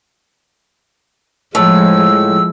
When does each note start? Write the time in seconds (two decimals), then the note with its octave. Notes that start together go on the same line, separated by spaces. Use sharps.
1.55 A2 F3 G#3 E6